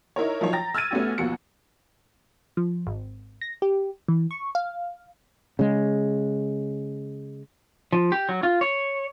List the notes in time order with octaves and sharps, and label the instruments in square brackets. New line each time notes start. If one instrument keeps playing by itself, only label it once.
[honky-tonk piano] D#4 E4 A#4 C#5
F3 F#3 D#4 C#5
G5 A#5 A6 A#6
E6 F6 G#6 A6 D#7
A3 B3 C#4 F#4 G4
D#2 B2 F3 F#4 C#7
[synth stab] F3
G#1
A#6
G4
E3
C#6
F5
[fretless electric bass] C#3 G#3
[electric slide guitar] F3
G4
F#3
F4
C#5